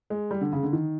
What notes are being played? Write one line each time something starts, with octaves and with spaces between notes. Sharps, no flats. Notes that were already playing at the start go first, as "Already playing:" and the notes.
G#3
G3
D3
C#3
D3
D#3